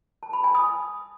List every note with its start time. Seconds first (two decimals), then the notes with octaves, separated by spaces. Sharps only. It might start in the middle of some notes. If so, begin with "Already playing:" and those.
0.23 A5
0.33 B5
0.44 G#5
0.55 D#6